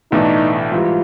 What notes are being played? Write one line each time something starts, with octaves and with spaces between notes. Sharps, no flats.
B1 A2 E3 A3 D4 D#4
G#2 E3 G3 F4